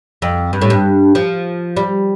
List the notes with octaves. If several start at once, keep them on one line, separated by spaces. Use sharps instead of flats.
F2
G2
A2
G2
F3
G3